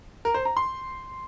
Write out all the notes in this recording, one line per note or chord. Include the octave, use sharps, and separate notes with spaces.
A#4
C5
A#5
C6